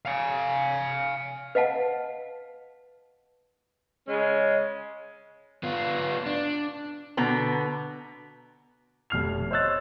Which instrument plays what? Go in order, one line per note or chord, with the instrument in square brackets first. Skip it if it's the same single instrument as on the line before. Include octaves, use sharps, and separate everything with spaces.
[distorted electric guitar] F5 G#5
[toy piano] B4 D#5 F5 F#5 A5
[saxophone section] C#3 G#3 C#4
[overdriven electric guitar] B3 F4
D4
[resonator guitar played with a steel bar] B2 D3 B3 A#5
[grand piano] F1 B2 F6 C7 F7
C5 C#5 D#5 E6 F#6 A6